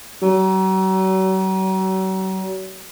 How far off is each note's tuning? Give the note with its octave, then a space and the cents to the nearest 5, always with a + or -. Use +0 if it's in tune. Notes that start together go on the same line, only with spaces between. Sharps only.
F#3 +40